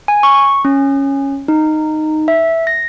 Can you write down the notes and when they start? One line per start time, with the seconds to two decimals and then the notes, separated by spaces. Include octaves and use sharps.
0.08 G#5
0.23 C#6
0.65 C#4
1.48 D#4
2.28 E5
2.67 A#6